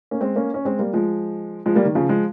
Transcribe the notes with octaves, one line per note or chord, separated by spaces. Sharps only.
A#3 C#4
G#3 C4
A#3 C#4
C#4
G#3 C4
G3 A#3
F3 G#3
F3 G#3
G3 A#3
D#3
C#3 F3
F3 G#3